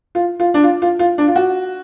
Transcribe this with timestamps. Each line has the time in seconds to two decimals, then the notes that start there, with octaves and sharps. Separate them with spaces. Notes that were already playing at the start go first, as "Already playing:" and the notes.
0.15 F4
0.40 F4
0.54 D4
0.63 F4
0.82 F4
0.99 F4
1.18 D4
1.28 F4
1.36 F#4